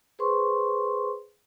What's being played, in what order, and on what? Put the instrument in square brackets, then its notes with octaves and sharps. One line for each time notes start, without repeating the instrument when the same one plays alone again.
[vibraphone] G#4 B4 C5 C6 C#6